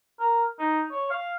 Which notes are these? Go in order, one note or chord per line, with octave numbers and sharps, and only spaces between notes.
A#4
D#4
C#5
F5